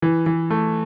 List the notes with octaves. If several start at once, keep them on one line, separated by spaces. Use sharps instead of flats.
E3
E3
A3